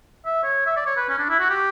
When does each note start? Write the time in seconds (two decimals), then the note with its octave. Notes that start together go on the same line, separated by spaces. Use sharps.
0.26 E5
0.43 C#5
0.66 E5
0.77 D5
0.87 C#5
0.97 B4
1.09 C#4
1.19 D4
1.30 E4
1.40 F#4
1.50 G4